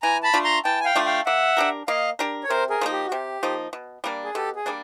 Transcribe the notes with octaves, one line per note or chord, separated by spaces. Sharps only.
E3 G#5 A#5
A5 B5
A3 D4 F4
A#5 C6
E3 G5 A5
G#5
F5 G5
A3 D4 F4
F5 G5
A#3 E5 F#5
D4 G4 A#4
A#3 D#5 F5
D4 G4 A#4
C#5
C3 A#4 C5
G#4 A#4
F3 A#3 D#4
G4
F#4
C3 G4
F3 A#3 D#4
B2
G3 A#3 D4
G#4
B2 G4 A4
G#4
G3 A#3 D4